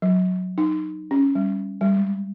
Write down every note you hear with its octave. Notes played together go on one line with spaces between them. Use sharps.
F#3
D#4
C#4
G3
G3
G#3